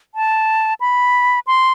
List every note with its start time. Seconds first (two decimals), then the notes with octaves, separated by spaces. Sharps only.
0.15 A5
0.80 B5
1.47 C6